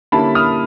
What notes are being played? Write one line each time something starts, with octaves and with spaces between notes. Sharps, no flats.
D3 G3 A#3 C#4 E4 A5 B5
D#6 F6